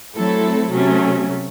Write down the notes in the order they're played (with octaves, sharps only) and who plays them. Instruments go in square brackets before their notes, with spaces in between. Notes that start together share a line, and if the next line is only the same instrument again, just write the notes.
[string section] F#3 A3 C4 E4 A4
C3 F#3 A3 C#4